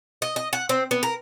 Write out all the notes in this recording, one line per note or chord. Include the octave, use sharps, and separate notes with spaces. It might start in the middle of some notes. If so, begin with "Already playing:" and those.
D#5
D#5
F#5
C4
B3
A#4